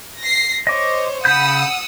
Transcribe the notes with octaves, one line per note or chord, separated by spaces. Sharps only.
A#6 C7
C5 C#5 D#5 D6
C#3 F#5 B5 D#6 E6 G6